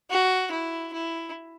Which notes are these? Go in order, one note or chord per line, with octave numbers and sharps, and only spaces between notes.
F#4
E4
E4